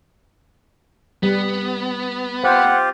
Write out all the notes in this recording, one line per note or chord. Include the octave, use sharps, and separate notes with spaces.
G3 B3
C4 F4 G4 C5 F#5